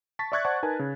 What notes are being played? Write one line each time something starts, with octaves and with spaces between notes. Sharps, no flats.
A5 C#6 A6 B6
D5 E5 C#6 F#6 G#6 A6
C5 D5 F#5 A5 C#6
D#4 A#4 B4 G#5 A5
C#3